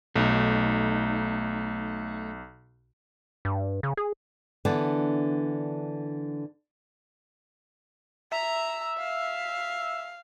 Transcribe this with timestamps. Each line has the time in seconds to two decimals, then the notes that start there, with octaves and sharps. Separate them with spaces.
0.16 B1 A3 D#4
3.45 G2
3.83 C#3
3.97 G#4
4.65 D3 E3 B3 D4
8.32 E5 A#5
8.98 F5